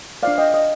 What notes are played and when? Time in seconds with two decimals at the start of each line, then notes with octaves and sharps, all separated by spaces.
0.23 D4 F4 C5 D5 F5
0.38 D#5 G5
0.54 D#5